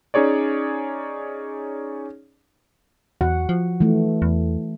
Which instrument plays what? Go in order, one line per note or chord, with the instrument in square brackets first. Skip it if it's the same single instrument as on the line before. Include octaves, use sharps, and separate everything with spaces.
[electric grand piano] C#4 D#4 G#4 C#5 D5
[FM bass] E2 [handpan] F#4 F#5
[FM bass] F3
[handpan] E3 A3
[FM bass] E2